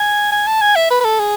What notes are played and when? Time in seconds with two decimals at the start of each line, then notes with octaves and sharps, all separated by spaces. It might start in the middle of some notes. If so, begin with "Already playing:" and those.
Already playing: G#5
0.32 G#5
0.47 A5
0.61 G#5
0.76 E5
0.91 B4
1.01 B4
1.05 A4
1.20 G#4